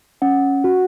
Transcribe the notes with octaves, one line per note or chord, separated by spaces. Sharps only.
C#4 F#5
F#4